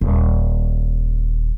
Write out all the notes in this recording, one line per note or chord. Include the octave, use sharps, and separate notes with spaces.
D#1